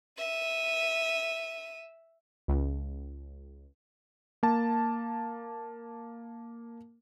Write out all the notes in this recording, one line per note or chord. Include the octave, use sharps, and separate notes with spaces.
E5 D#7
C#2
A#3 A5